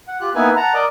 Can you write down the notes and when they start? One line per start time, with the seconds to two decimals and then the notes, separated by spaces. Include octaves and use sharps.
0.08 F#5
0.21 F4 G4 F#6
0.35 A#3 B3 D#4 E4 B4 G#5
0.56 F#5 A5 A#5
0.74 A#4 D5 D#5 D6